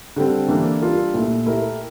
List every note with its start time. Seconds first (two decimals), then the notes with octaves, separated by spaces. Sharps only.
0.16 D3 G3 C4
0.48 E3 A#3 D4 A4
0.82 G3 D4 F4 A#4
1.14 A#2 A3 E4
1.46 A3 E4 G4 A#4